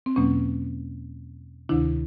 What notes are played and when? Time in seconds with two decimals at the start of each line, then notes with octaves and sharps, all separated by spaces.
0.06 C4
0.16 E2 B2 F#3 A#3 C#4
1.69 D2 C3 D#3 D4 E4